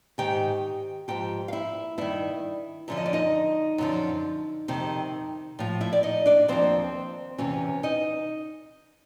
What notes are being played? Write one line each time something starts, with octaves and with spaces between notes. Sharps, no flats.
G#2 D#3 G4 G5
G#2 F3 G4 G5
F5
E4 E5
G2 D#3 E4 E5
F#2 D3 F3 E5
D#5
D5
D#4 D#5
F#2 D3 F3
F2 C3 D#3
A2 F3
E4 E5
D5
D#4 D#5
D4 D5
D#2 C#3 F3 C4 C5
E2 C3 E3 C#4 C#5
D#4 D#5